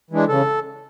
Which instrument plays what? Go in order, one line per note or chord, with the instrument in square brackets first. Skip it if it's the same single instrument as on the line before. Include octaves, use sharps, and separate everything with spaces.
[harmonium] E3 G#3 D4
C#3 A4